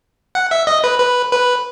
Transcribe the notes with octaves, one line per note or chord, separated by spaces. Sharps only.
F#5
E5
D#5
B4
B4
B4